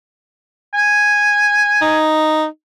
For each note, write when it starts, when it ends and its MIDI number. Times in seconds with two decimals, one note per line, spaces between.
0.74 2.06 80
1.82 2.45 63